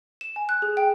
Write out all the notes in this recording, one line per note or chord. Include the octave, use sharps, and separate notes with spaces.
E7
G#5
F#6
G#4
G5